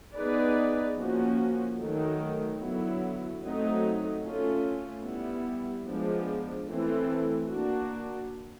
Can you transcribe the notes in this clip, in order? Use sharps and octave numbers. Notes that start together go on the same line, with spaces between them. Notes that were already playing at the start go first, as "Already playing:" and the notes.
B3 D#4 G#4 B4 D5
F3 A#3 C#4 F#4
D#3 F#3 A3
D3 F#3 B3 E4
F#3 A3 C4 D#4
A3 C#4 F4
G3 B3 E4
F3 G#3 B3 D4
E3 A3 C4 E4 A4
A#3 D4 F#4